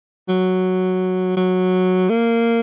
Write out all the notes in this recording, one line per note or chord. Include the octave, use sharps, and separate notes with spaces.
F#3
F#3
A#3